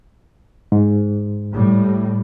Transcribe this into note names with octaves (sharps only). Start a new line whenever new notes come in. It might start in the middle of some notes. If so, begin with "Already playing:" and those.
G#2
A2 G3